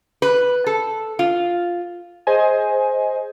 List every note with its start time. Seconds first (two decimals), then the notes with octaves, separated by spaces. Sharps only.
0.22 B4
0.66 A4
1.19 F4
2.27 G#4 C5 D#5 G#5